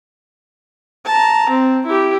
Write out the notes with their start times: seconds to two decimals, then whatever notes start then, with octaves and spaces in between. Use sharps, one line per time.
1.05 A5 A#5
1.50 C4
1.86 E4 G4